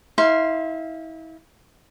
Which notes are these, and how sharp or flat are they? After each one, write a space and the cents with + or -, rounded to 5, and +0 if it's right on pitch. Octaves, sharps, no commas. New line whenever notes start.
E4 -35 F5 -15 C6 +5